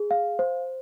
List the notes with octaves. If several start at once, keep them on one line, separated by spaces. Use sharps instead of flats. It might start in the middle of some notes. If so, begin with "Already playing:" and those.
Already playing: G#4
F5
C5